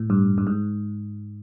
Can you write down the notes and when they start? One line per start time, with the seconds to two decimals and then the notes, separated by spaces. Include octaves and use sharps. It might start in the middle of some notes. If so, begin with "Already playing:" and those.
Already playing: A2
0.10 G2
0.38 G2
0.47 G#2